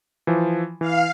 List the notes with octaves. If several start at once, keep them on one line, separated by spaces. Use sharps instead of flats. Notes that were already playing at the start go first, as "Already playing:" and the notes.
E3 F3
E3 F5